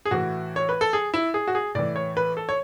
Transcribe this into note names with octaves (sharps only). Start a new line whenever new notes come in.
G#4
A2 E3 F#4
C#5
B4
A4
G#4
E4
G#4
F#4
G#4
A2 E3 D5
C#5
B4
A4
C#5